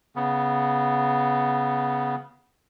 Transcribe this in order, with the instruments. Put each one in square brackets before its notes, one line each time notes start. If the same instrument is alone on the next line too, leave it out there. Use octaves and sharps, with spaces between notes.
[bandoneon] C#3 B3